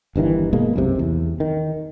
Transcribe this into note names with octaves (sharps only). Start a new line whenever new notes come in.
G1 G2 D#3 E3
B2 G#3 A#3
B1 F#2 C3
E2
D#3